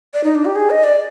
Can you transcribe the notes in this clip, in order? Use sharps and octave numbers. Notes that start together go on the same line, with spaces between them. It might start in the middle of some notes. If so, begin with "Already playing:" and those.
D5
D#4
D4
G4
G#4
D#5
D5